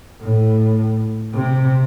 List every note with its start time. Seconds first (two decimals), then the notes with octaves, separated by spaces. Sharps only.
0.21 A2
1.34 C3